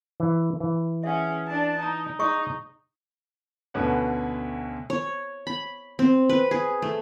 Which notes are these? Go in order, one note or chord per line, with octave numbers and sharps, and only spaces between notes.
E3
E3
C#4 G#4 E5 F#5
D4 A5
D#4 A5 A#5
D#4 G#4 D#5 C#6 D#6
D2 B2 D3 C#4 B4 F#5
C#5
B5
C4
B4
G#4
A3